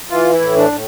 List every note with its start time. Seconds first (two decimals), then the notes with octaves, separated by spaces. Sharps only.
0.10 E3 F4
0.33 E4
0.41 A2
0.56 D4
0.72 A2